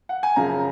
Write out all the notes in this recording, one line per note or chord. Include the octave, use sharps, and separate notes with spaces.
F#5
G#5
F#2 C#3 F3 A#5